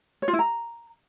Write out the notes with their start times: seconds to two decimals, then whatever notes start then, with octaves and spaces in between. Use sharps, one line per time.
0.22 C#5
0.28 F4
0.33 E4
0.39 A#5